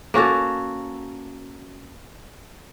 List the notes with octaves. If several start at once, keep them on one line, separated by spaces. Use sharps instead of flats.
A#3 C#4 F#4 A4